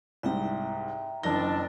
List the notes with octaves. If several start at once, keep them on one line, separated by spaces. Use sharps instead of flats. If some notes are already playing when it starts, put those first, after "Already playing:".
C2 G#2 E5 G5 A#5
F#1 D#3 D4 E4 A5 A#6